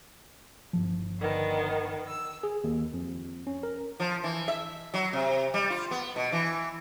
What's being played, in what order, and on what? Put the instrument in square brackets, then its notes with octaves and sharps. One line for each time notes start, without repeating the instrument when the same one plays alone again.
[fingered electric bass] G1 C#2 F3
[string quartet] D3 D#3 B3
E6
[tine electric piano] G#4
D#2
F2
C#4
A#4
[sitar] F3
E3
E5
F#3
C3
G3
F4
B3
B2
E3